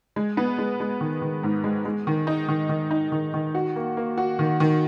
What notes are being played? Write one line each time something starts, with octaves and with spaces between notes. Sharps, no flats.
G#3
B3
G#3
G#3
D#3
D#3
G#2
G#3
G#3
D#3
D#4
D#3
D#3
D#4
D#3
D#3
F#4
A#3
A#3
F#4
D#3
D#3